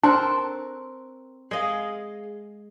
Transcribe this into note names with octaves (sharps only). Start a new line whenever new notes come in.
C4 D4 A4 A#4 C6 C#6 F#6
G#3 G#4 D#5 F5